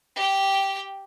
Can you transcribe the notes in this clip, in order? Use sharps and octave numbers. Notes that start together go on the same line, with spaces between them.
G4 G5